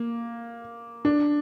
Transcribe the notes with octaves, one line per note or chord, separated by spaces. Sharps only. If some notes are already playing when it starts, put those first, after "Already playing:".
Already playing: A#3
D4